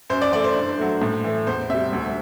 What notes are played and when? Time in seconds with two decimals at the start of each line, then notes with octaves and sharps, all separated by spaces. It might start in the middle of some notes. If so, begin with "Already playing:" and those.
0.10 F#2 C5
0.22 D5
0.32 E3 A3 D5
0.44 C5
0.56 G2
0.79 F#3 A3
1.02 A2
1.24 E3 A3
1.47 E2 C5
1.70 C3 G3 E5
1.93 D2